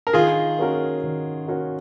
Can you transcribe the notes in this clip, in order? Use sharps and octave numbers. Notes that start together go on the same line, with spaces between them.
A#4
D#3 F4 G#4
A#3 C#4 F#4 A#4
D#3
A#3 C#4 F#4 A#4